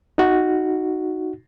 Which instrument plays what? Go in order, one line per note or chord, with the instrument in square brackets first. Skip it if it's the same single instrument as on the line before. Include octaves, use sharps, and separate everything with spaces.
[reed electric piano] D#4 F#4